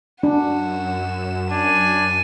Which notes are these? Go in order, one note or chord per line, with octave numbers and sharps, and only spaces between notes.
F#2 D4 F#4 E7
D4 G#5